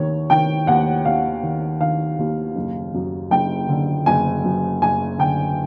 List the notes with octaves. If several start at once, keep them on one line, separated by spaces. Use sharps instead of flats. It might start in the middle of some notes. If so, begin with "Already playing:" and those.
Already playing: D#2 D#3 C#5
D#3 G5
D#2 F#5
D#2 F5
D#3
D#3 F5
D#2
F#1
F#2
F#1 G5
D3
F#1 G#5
F#2
F#1 G#5
D3 G5